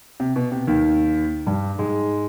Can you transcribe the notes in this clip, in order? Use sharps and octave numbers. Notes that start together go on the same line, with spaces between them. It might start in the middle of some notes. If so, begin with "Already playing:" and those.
C3
B2
C3
D#2 D#3
G2 G3
G#2 G#3